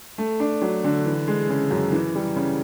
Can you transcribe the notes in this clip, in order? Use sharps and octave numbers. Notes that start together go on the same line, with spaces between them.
A3
D4
F#3
D3
E3
G#3
C#3
F#2
E3
G3
C#3